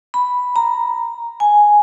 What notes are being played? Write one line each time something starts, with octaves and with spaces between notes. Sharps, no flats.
B5
A#5
G#5